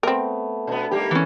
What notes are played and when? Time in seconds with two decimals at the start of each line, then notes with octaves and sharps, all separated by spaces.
0.03 A3 B3 C4 A#4
0.67 B2 B3 D4
0.91 D#3 G3 A#3 G4
1.11 E3 C#4